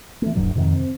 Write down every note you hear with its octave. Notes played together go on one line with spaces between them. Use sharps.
E3 A3
D1 G2 D3 F#3
F2 G#2 C3 D#3
C4